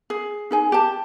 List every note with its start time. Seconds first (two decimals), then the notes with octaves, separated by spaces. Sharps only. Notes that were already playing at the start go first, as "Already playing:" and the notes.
0.10 G#4
0.51 D#4 G#4 G#5
0.72 G4 A5